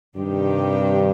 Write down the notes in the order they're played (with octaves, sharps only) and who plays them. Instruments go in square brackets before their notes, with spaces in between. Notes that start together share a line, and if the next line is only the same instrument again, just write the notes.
[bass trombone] G2 [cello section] C3 D#3 G3 D4 G4